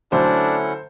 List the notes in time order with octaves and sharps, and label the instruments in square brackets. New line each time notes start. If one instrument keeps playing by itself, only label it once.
[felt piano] D3 F#3 A3 [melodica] C#4 E4 F#5 [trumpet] D4 [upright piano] C5